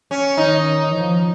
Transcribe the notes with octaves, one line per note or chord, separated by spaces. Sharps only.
C#4
D#3 D#4
F3